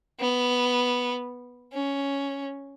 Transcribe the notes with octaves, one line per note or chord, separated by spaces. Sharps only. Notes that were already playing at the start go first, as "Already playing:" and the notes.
B3
C#4